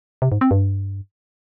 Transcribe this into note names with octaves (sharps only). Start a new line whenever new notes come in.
C3
G#2
C4
G2